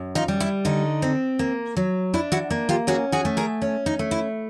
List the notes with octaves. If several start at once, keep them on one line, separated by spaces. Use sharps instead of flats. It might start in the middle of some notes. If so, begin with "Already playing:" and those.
Already playing: F#2
D#4 F4
G3
E4
D3 D#4
C4
A#3
F#3
D4 E4
E4 F#4
A#3
F4 G4
C#4 F#4 G#4
F#4 G#4
A3
G#4 A#4
C#4
D#4
A3
E4